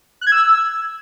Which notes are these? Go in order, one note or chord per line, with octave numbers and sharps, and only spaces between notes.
F#6
G#6
E6